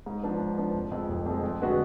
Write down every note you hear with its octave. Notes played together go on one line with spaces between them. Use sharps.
G#2
F3 B3 D4
G#2
F3 B3 D4
F1
F2 F3 G#3
F1
F2 F3 G#3
F2
D3 G#3 B3 F#4